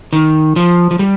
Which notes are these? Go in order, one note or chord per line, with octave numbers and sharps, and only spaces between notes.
D#3
F3
F3
G3